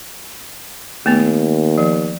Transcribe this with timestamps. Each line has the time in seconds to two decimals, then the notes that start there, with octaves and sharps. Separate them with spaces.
1.06 D#2 A3 B3
1.78 F3